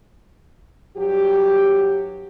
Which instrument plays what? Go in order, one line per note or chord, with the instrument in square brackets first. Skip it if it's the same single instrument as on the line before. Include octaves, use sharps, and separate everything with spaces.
[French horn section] G2 F#3 G4